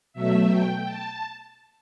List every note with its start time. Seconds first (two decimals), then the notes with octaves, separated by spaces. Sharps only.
0.13 B2 F#3 A3 E5
0.49 G5
0.85 A5